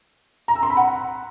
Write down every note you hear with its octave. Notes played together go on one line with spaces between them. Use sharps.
A#5
E6
C6
B5
F#5